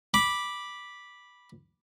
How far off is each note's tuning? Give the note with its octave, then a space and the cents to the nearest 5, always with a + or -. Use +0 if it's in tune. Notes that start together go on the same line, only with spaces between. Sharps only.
B5 -10 D6 +0